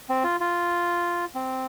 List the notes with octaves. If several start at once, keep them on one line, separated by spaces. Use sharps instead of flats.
C4
F4
F4
C4